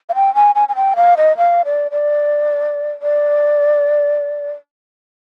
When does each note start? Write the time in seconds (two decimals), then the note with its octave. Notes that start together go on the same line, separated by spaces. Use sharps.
0.09 F5
0.15 G5
0.35 G#5
0.55 G#5
0.69 G#5
0.75 G5
0.96 F5
1.17 D#5
1.37 F5
1.65 D5
1.91 D5
3.02 D5